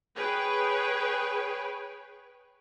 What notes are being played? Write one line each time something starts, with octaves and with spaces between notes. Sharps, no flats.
G#4 B4 C#5 G5